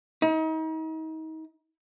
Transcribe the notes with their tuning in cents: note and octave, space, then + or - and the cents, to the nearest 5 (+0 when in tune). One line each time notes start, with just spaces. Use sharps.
D#4 +35